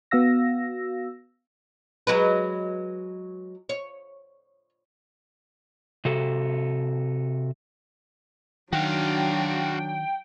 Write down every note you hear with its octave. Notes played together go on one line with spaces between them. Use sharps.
B3 F#4 F5 E6 A#6
F#3 G#3 B4
C#5
C3 F#4 A4
D#3 F#3 D4 F#4 F5 G5